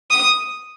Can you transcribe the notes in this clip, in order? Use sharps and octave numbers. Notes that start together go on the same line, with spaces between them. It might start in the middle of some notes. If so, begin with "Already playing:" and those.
D#6